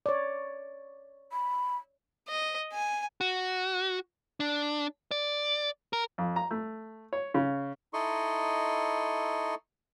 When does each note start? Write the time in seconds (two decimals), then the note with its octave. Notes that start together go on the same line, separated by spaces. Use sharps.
0.06 C#5 D5
1.32 B5
2.28 D#5
2.72 G#5
3.21 F#4
4.40 D4
5.11 D5
5.93 A#4
6.18 F2
6.36 A#5
6.51 A3
7.13 C#5
7.34 C#3
7.94 D#4 E4 A4 D#5 C6 C#6